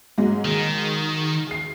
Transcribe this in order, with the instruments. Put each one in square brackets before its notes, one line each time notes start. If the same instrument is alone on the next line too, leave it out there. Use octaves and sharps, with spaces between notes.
[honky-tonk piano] G#2 F#3 G#3
[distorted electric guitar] D#3
[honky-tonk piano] G#4 C7